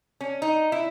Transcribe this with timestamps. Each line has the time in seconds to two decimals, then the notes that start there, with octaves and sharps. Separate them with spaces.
0.21 C#4
0.42 D#4
0.72 E4